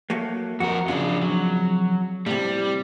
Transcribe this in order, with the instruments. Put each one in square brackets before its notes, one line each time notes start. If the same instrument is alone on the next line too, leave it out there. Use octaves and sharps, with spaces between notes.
[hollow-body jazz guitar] F#3 A3 A#3
[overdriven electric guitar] F2 A#4 [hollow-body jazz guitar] F#4
[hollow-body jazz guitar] F2 C#3 [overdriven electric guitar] D4 F4
[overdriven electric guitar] F#3
[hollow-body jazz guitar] A2 C3 [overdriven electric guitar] G3